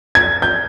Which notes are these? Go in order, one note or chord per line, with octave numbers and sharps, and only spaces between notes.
G#6
G6